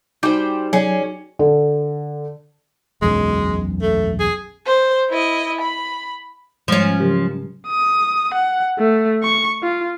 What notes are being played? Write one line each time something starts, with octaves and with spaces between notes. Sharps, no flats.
G3 D#4 F#4 C5 G5 D6
F#3 C#4 G#4 D5
D3
E1 B1 F#2 G#3
A3
G#4
C5
E4 D#5
B5
G#2 F3 G3 G#3 C#4
C#3 F#3 G4
C#4
D#6
F#5
A3
C#6
F4